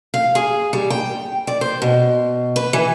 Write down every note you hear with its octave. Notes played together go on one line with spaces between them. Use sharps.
F5
G#4
G3
G5
D5
C5
B2
B4
E3